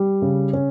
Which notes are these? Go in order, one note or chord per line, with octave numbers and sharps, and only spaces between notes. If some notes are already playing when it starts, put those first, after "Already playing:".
Already playing: G3
C#3
C#4